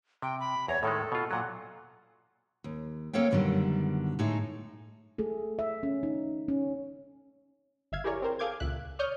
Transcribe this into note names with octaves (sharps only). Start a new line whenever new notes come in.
C3 G5
B5
E2 C#5 A#5
A2 D#3 G#3 A4
B2 F4
A#2 F#3 F#5
D#2
A#3 C4 A4 C#5 F5 G5
F#2 B2 D3 D#3 G3
A2 G#3 D#4 G#4 A4
A3 G#4 A4
E5
C#4
D#4
C#4
G1 E5 F5 G#6
E4 G4 G#4 A#4 C#5 D5
C4 G4 A#4 C5
G#4 A4 F5 D6 G6 G#6
C#2 A#2 E5 F#6
C#5 D5 C#6 D#6 F6 G6